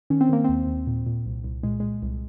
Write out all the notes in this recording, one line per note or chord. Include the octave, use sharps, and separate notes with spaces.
D#3 C#4
C4
D#3 A#3
D#2 C4
D#2
A#2
A#2
C2
C2
A#2 G#3
A#2 G#3
C2